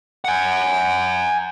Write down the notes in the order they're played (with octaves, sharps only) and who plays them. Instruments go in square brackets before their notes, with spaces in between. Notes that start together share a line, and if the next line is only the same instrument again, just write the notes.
[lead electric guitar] F#5 G#5